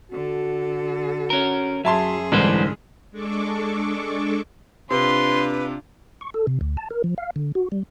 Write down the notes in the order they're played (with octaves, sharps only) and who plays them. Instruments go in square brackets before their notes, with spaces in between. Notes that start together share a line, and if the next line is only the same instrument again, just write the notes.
[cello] D3 A4 [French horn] F#4
[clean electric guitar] C#4 A#4
[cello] F#2 G#4 [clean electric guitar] F#3 [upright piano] E5 A5 C6
[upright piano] C2 G#2 D3 [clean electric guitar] E3 D4 C5
[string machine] G#3 D4 A4 C#6 D6
[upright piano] C3 [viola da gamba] D4 F4 [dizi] B4 [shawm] C6
[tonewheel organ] C#6
A4
C3
D2
A5
A#4
F3
F5
D3
F#4
G3